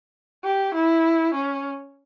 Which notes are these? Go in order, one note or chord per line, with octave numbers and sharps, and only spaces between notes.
G4
E4
C#4